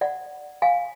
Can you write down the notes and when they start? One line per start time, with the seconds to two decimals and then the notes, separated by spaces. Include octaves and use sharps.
0.01 D5 F#5
0.62 F5 G#5